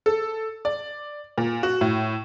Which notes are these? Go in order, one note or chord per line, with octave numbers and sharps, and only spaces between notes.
A4
D5
A#2
F#4
A2